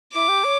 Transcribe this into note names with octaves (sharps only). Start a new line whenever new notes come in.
E4 D6
G4
C#5